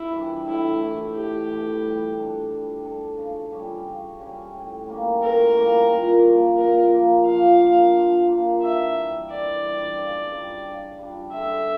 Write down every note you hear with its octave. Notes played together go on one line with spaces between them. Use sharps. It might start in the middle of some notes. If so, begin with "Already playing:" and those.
Already playing: E4
E3 G3 D4
A2 E4
E3 A3
A2 G4
E3 A3
G3
D4 A4
G3
D4 A4
C#3
G3 C#4 G4
C#3
G3 C#4 G4
A2
G3 A#3 C#4
A2 A#4
G3 A#3 C#4
A#2
F3 A#3
A#2 A#4
F3 A#3
F3 F5
A#3 D4 F4
F3
A#3 D4 F4
E3 E5
G3 D4
E3 D5
G3 D4
C#3
G3 D4
C#3
G3 D4
D3 E5